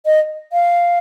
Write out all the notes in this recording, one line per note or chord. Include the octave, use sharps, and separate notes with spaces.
D#5
F5